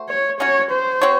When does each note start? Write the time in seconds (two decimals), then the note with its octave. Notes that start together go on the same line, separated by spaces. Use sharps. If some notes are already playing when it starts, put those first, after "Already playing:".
Already playing: A3 F#4 C5
0.08 C#5
0.40 F#3 C#4 F#4 C#5
0.71 C5
1.02 C4 F#4 C#5